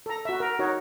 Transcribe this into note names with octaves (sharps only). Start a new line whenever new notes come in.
A4 A#5
F#4 E5
A#4
D#4 F#4 C#5